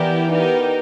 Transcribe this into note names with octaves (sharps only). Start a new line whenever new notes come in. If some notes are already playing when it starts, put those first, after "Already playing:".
Already playing: E3 B3 E4 G4 A#4 D5
B3 D#4 G4 A#4